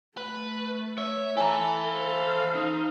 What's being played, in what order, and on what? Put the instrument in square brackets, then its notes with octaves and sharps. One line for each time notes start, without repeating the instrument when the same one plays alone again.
[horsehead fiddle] A3 [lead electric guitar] B4
[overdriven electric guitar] C#5 [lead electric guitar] E5
[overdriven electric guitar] E3 E4 [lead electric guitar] A4 [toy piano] G#5 A#5
[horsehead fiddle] C5 F5
[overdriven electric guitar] D#4